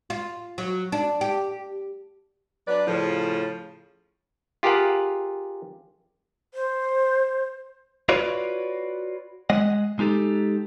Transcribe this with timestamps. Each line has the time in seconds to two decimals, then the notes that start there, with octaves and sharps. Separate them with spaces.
0.10 F4
0.58 F#3
0.92 D4
1.21 G4
2.68 F#3 D4 B4 D5
2.87 A2 C#3 F3
4.63 F4 G4 G#4 A#4 F5 F#5
6.54 C5
8.09 F4 F#4 B4 C#5 D5
9.50 G#3 D#5 F#5
9.99 G#3 D#4 G4 A4